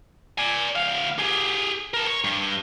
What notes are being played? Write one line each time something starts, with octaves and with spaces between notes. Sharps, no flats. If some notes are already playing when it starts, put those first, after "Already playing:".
D5 G#5
D2 F5
G4 G#4
A#4 A5
C#5
G2